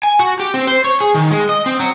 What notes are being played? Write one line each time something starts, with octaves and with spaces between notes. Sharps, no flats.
G#5
F#4
G4
C4
C5
C#5
G#4
D#3
G#3
D#5
C4
F#3